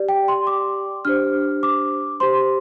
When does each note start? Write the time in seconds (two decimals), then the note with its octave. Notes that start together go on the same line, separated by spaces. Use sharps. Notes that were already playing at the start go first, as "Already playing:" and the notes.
Already playing: G4 D5
0.09 G5
0.28 C6
0.47 D6
1.05 D4 G4 C5 F6
1.63 D6
2.20 G4 C5 C6